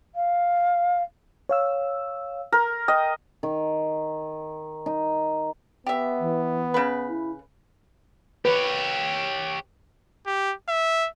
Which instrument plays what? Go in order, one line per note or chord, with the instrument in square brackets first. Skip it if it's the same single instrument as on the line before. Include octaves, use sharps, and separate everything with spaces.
[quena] F5
[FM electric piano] C#5 F5 E6
[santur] A#4
[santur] D#5 [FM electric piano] G5
[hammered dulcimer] D#3
D#4
[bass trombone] B3 [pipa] G4 E5
[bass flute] E3
[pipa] C#3 B4
[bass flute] E4
[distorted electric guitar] G4 C#5 [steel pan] B4
[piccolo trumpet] G4
E5